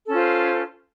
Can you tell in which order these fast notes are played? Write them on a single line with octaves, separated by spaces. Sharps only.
A4 C#4 F4 C5